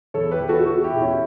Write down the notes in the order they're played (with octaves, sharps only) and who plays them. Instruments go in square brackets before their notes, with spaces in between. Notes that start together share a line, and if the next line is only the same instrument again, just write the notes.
[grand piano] E2 A4 C#5
G4 B4
E2
F#4 A4
E2 F#4 A4
E4 G4
B2
C#4 E4